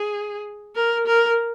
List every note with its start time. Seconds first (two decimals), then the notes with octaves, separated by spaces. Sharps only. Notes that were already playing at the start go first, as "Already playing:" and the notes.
Already playing: G#4
0.75 A#4
1.06 A#4